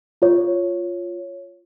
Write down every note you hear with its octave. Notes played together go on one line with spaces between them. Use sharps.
F4 C#5